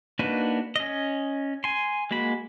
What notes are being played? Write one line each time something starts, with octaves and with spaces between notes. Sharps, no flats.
A#3 D4 D#4 F#4 B4
C#4 D#5
G#5 C6
G#3 A#3 F#4 B5